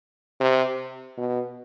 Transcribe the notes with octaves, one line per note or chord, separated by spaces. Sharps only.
C3
B2